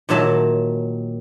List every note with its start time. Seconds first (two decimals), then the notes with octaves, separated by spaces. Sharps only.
0.09 A#2 D#3 F#3 E5 A5